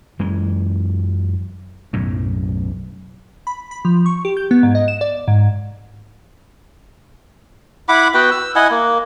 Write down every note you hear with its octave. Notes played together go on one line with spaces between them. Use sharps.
F#2 E3 G#3
B1 F#2 A2
B5
B5
F3
C#6
G4
G6
B3
G#2
D#5
E7
D5
G#2
E4 F#5 B5 D6
B3 F#4 B4 G5
E6
E4 D#5 F#5 G#5
A#3